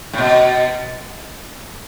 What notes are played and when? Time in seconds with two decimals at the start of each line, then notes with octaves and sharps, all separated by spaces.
0.13 A2
0.18 B2